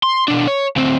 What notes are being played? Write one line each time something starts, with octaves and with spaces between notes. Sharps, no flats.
C6
B2 D4
C#5
D2 C4